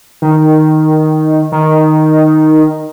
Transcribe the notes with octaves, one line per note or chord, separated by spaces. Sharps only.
D#3
D#3